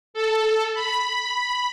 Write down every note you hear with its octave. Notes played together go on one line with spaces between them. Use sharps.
A4
B5